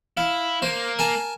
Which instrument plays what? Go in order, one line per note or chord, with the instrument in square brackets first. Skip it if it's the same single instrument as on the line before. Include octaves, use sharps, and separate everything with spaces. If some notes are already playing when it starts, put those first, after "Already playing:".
[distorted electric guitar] E4 [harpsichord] F5
[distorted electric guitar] A#3 [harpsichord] C5
[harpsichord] A#4 G#5 A5